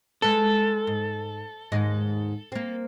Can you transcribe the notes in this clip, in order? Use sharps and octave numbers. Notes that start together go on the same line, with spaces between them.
G#3 A4 B4
G#2
D#2 G#2 D#5
A#3 C4